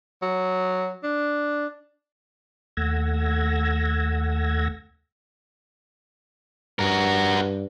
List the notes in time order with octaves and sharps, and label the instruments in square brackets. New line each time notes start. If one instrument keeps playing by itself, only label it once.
[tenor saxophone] F#3
D4
[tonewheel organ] D#2 A3 F#5 E6 G#6 A#6
[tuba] G2 [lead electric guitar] F#4 A#4